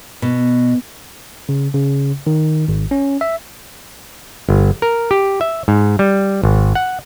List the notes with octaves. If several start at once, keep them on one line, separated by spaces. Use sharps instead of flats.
B2
C#3
C#3
D#3
G#1
C#4
E5
G1
A#4
G4
E5
G#2
G3
G#1
F#5